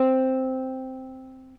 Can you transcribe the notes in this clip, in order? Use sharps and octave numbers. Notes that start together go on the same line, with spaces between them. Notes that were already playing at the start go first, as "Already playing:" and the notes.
Already playing: C4